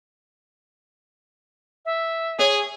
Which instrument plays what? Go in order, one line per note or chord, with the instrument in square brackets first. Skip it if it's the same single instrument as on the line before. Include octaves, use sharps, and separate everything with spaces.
[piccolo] E5
[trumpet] G#4 [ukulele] C#5